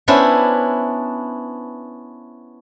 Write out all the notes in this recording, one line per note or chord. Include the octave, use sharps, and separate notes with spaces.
B3 C#4 D4 E4 B4 C5